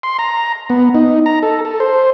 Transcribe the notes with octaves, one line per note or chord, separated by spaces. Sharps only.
C6
A#5
B3
D#4
A#5
A4
A4
C5